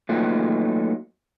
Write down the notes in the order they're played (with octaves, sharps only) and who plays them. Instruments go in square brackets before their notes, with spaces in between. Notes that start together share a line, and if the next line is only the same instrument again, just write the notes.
[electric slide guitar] F#3 A3 A#3 D#4 F4 B4